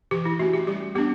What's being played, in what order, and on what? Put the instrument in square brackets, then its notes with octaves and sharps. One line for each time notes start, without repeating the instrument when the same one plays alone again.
[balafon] E3 G4
E4
A3 C#4 F#4
G4
G3 G4
B3 D4 G4